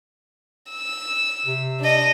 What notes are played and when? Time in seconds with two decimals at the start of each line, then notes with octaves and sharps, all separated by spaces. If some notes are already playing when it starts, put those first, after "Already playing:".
0.72 E6
1.45 C3
1.80 D4 D#5